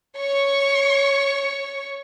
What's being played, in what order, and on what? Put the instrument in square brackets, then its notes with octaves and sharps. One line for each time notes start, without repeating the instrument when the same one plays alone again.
[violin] C#5 C#6